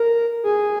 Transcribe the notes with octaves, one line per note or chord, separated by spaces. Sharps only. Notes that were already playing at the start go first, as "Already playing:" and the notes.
Already playing: A#4
G#4